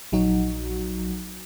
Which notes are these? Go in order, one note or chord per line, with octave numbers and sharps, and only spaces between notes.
A#1 F#3 D#4 F#4